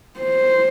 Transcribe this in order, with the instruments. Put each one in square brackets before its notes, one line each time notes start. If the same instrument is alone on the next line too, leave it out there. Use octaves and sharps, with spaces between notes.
[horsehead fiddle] C5